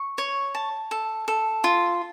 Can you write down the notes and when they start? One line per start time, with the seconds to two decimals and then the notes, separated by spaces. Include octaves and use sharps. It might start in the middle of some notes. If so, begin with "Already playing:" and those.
Already playing: C#6
0.18 C#5
0.55 A5
0.91 A4
1.28 A4
1.64 F4